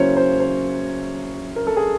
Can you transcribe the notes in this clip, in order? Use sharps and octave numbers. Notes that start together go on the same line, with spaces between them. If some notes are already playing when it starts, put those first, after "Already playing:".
Already playing: C#3 F#3 A#3 C#4 E4 C5 C#5
C5
C5
A#4
A4
G#4